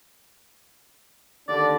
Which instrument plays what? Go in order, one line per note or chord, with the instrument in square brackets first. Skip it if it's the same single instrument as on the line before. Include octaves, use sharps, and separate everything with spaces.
[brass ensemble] D#2 D3 D4 [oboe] D5